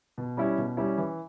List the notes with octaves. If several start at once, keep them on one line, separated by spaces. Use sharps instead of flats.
B2
G3 C#4 E4
B2
G3 C#4 E4
E3